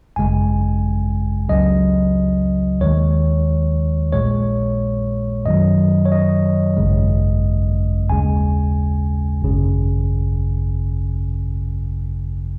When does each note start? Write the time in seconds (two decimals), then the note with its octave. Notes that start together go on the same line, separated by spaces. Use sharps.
0.16 G#1 F#2 C#3 G#3 G#5
1.49 C#2 C#3 F#3 D#5
2.81 D#2 D#3 G#3 C#5
4.12 A#1 A#2 G#3 C#5
5.46 F#2 D#3 F#3 D#5
6.06 C#5
6.12 D#5
6.77 G#1 F#2 C#3 G#3
8.10 D#2 C#3 G#3 G#5
9.42 G#1 F#2 C#3